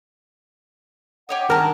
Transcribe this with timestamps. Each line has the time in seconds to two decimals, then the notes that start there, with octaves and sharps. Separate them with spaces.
1.29 G4 C#5 D#5 F#5
1.50 D#3 D4 A#4 A5 A#5 F6